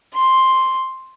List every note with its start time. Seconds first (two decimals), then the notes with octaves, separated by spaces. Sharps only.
0.14 C6